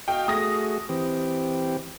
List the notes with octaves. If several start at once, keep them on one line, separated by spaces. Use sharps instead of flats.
F#4 D#5 F5 G5
A3 F#4 G#4 D#6 A#6
E3 C4 G4